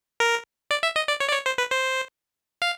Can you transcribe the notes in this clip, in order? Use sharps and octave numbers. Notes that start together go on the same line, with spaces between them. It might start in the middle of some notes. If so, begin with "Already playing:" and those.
A#4
D5
E5
D#5
D5
C#5
D5
C#5
C5
B4
C5
F5